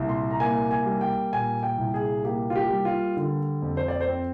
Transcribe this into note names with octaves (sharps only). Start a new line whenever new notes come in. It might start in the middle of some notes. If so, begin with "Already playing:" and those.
Already playing: C2 A#2
C6
A#5
A#3 G#5
G#5
G3
G5
A#2 G#5
G5
C2
G#4
A#3 G4
F4
G4
G3
F4
D3
F2
C5
D5
C5
C4